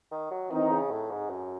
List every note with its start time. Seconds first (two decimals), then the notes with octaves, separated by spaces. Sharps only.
0.11 D#3
0.31 F#3
0.51 D#3 E3 C4 D#4
0.70 C#3
0.91 A2
1.10 G#2
1.30 F#2